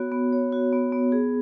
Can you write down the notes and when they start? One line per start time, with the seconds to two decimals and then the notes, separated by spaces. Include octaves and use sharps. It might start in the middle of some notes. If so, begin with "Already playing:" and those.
Already playing: B3 F#4 C#5
0.12 B3
0.33 C#5
0.52 F#4
0.73 B3
0.92 B3
1.12 G#4